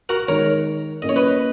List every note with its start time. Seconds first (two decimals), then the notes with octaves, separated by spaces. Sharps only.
0.09 F#4 A#4
0.28 D#3 G#3 D#4 A#4 C#5
1.02 A#2 A#3 C#4 E4 D#5
1.09 C#5
1.16 B4 D#5